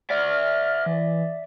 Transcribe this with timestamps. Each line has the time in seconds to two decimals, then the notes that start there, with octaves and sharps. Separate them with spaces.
0.10 D5 E5 F6
0.86 E3